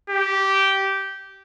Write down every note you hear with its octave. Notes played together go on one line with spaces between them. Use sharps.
G4